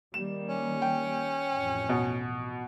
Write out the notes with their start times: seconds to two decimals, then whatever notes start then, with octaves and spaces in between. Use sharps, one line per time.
0.14 D#3 G3 A#3 E7
0.49 C#4
0.82 G5
1.52 A1 F2
1.89 B2